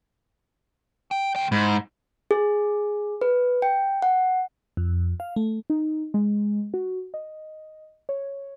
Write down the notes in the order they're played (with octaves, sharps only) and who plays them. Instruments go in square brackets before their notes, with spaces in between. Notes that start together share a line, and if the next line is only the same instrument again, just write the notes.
[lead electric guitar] G5
D2 G5
[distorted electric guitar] G#2 [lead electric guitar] E4
[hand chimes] G#4
B4
G5
F#5
[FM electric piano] F2
F5
A3
[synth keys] D#4
G#3
F#4
D#5
C#5